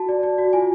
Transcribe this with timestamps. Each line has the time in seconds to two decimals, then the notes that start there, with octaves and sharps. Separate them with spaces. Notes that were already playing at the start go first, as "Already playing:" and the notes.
Already playing: F#4 A5
0.09 D5
0.23 D5
0.38 F#4
0.53 F4 G#5